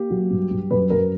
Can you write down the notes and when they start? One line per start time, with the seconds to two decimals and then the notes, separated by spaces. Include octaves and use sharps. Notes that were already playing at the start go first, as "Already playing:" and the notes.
Already playing: A#3 G4
0.10 F#3
0.30 G2
0.51 G2
0.71 F#2 B4
0.90 F#2 A#4